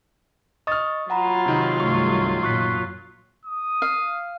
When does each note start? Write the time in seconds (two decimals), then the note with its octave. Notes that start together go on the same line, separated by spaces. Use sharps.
0.67 D#5 C#6 D#6 F6 A6
1.10 F#3 F4 F#5 A#5 B5
1.46 C3 D#3
1.80 C2 G2 A3 C#6
2.43 A1 F#2 A#2 C#6 F#6 B6
3.46 D#6
3.82 F5